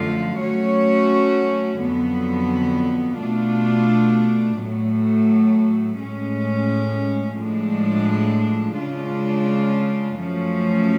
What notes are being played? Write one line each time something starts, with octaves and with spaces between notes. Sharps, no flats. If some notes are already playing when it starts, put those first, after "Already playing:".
Already playing: F#2 D3 F3 A3 F4
F#3 A3 C#4 F#4 C#5
F2 D3 F#3 B3
B2 A3 D4 F4
A2 F#3 A3
A2 G#3 C#4
A2 F3 G#3 D4
C#3 G#3 D4 F4
F#2 F3 A3 C#4